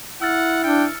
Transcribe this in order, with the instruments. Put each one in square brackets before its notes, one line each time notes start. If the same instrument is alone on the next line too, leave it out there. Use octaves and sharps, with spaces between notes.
[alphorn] E4 [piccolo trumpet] F#5 [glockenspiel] E6 F6 A6
[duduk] D4 [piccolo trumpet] G5 [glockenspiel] C#7